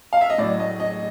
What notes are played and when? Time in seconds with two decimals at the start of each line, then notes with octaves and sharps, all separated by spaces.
0.13 F5
0.21 E5
0.30 D#5
0.38 A2 F#3 D5
0.60 D#5
0.80 D#5